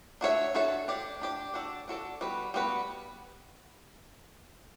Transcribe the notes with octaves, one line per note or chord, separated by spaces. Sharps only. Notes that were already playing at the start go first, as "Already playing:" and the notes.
D4 F#4 A4 C#5 E5
D4 F#4 A4 C#5 E5
D4 G4 D5
D4 G4 D5
D4 F#4 A4 D5
D4 F#4 A4 D5
G3 B3 F#4 B4
G3 B3 F#4 B4